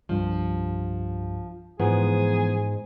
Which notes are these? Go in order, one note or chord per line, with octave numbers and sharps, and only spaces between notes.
C2 G2 F3
G#2 E3 F3 B3 G#4